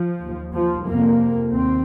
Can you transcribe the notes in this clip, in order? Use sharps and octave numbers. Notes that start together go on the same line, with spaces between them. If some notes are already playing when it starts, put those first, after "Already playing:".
Already playing: F3
D#2
F3
F2 C3 A#3
D#2 C4